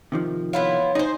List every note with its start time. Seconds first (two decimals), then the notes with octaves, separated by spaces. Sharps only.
0.12 C3 D#3 F3
0.53 B3 E4 F4 C#5
0.95 D#4 G#4 C5